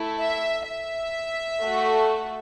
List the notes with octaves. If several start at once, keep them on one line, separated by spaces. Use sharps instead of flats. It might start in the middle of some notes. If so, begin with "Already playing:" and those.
Already playing: A3 E4 A4
E5
E5
A3 F#4 A4